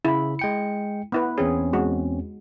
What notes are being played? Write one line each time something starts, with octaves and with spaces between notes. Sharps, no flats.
C#3 E4 B5
G#3 G5 C#7
B3 E4 B4
E2 C4 C#4 G#4
G#3 F#4